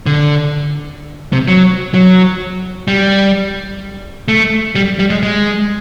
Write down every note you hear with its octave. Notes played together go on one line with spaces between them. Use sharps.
D3
C3
F#3
F#3
G3
A3
G3
G3
G#3
G#3